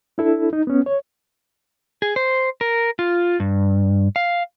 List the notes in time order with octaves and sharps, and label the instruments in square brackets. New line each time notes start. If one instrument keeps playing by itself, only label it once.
[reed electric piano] D4 E4 A4
D#4
B3 C#4
C#5
[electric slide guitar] G#4
C5
A#4
F4
G2
F5